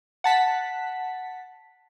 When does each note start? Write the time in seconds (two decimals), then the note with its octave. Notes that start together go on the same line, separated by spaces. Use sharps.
0.24 F#5 A5 B6